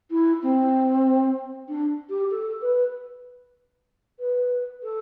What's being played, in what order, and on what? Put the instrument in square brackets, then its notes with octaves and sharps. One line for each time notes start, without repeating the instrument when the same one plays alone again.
[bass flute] E4
C4
D4
G4
A4
B4
B4
A4